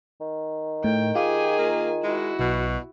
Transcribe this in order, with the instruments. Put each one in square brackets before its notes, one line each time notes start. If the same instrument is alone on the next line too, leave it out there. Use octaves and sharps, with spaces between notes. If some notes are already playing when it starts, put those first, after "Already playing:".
[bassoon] D#3
[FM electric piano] A2 [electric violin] G5
[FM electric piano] F4 [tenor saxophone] G4 [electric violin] G#4 G#5
[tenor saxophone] A#3
[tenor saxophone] G#3 [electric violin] E4 F#4
[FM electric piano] B1 [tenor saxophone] B2